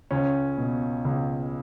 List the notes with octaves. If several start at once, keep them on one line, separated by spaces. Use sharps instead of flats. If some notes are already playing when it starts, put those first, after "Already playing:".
C#2 C#4
B2
C#2